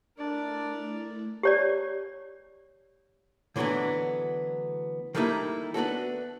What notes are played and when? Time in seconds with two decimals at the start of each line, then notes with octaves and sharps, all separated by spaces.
0.18 A3 D4 E4 A#4 D5
1.43 G4 C#5 D5
3.56 D3 E3 F#3 A3 B3 D4
5.15 D#3 G3 A3 A#3 D#4 E4
5.74 B3 D4 F#4 A4